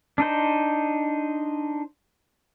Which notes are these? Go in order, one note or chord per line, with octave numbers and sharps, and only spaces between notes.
D4 D#4 C5